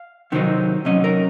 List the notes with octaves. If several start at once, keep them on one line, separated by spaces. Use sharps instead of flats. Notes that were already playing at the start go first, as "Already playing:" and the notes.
Already playing: F5
C3 D#3 F#3 C4 D#4
C3 F#3 C#4 D#5
A#4